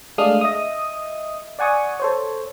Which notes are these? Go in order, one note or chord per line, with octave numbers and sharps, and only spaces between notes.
G#3 A3 D4 F5 D#6 F6
D#5 E5 D#6
D5 F#5 G#5 C#6 D#6
A4 C5 C#5